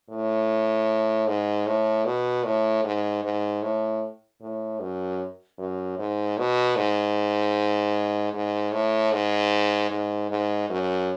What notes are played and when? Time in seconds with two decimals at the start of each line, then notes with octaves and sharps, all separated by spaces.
0.10 A2
1.27 G#2
1.67 A2
2.05 B2
2.45 A2
2.84 G#2
3.24 G#2
3.63 A2
4.41 A2
4.81 F#2
5.58 F#2
5.98 G#2
6.38 B2
6.76 G#2
8.33 G#2
8.72 A2
9.12 G#2
9.90 G#2
10.30 G#2
10.69 F#2